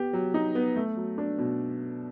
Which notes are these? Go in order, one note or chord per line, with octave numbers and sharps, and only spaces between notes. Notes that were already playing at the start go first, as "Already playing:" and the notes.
Already playing: B3 G4
F#3
D#4
B3
A3
F#3
D4
B2